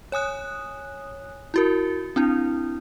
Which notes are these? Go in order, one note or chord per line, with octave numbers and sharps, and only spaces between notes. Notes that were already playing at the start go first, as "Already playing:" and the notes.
C#5 G#5 D#6 F#6
E4 F#4 A#4
C4 D4 E4